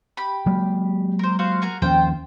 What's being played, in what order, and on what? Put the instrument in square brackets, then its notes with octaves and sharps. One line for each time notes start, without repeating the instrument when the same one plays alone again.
[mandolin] G4 B5
[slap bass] F#3 G#3 A#3
[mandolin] A#4 C5
F#4 C5 F5
F#4 G#4 A#4
[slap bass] D#2 F3 C#4 [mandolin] F4 C5 G5